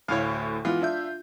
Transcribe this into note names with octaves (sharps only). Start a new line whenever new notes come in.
D2 A2 C#5 F5
E3 G#3 B3 F4
D4 E5 G6